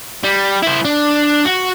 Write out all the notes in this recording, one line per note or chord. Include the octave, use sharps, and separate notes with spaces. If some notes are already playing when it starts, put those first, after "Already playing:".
G3
E4 C5
D4
F#4